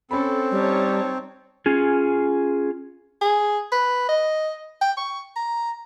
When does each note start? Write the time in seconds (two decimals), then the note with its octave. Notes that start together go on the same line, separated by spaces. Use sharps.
0.11 C4 C#4 A4 B5
0.51 G3 D#4 C#5 A5
1.66 C#4 F4 G#4
3.22 G#4
3.72 B4
4.09 D#5
4.82 G5
4.97 C#6
5.36 A#5